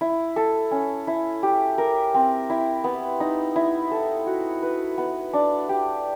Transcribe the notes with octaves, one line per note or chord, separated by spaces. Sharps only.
E4
A4
C#4
E4
G4
A#4
C4
E4
B3
D#4
E4
A4
F#4
B4
B3
D4
G4